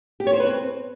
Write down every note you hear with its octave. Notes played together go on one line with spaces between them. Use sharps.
G4
C#5
C5
B4
C4